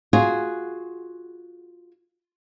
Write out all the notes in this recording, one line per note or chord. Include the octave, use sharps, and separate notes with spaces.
F4 F#4 G#4